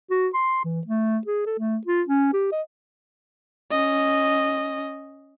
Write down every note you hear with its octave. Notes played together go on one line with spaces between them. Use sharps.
F#4
C6
E3
A3
G#4
A4
A3
F4
C#4
G4
D#5
C#4 D#5